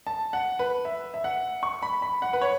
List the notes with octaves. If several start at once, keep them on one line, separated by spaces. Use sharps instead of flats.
A5
F#5
B4
E5
E5
F#5
C#6
B5
B5
F#5
B4
C#5